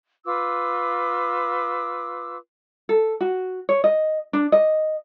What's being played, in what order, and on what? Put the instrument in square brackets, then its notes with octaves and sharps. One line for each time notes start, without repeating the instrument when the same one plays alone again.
[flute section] F4 B4 D6 E6
[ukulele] A4
F#4
C#5
D#5
D4
D#5